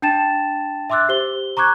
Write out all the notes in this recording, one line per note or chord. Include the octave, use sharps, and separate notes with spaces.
D4 G5 A5 A6 E7
E5 C6 D6 E6 F#6 A6
G4 C5 G7
A#5 C#6 D6 F#6 G#6